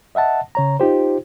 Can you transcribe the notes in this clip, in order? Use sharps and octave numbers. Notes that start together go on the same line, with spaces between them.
D#5 E5 F#5 A5
C#3 C#5 A#5
D#4 F4 G4 C5